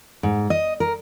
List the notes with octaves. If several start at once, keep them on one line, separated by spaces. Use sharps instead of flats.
G#2
D#5
A#4